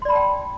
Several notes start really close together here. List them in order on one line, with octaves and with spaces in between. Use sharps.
C6 D5 B5 A5 G5